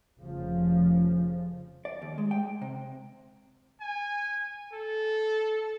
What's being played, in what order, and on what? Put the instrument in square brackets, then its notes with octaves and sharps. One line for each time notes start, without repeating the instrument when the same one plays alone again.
[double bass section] F1 C#3 F3
[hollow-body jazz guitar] D5
D#2
G#3
G5
C3
[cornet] G#5
A4